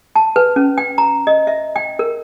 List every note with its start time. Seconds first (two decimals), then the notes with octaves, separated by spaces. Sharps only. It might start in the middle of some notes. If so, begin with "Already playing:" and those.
0.16 A5
0.36 B4
0.56 C#4
0.78 G5
0.98 A#5
1.27 D#5
1.47 E5
1.76 G5
1.99 A#4